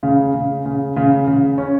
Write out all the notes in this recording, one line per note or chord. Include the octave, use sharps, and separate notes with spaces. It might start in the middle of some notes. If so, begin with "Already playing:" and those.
C#3
C#3
C#3
C#3
C#3
C#4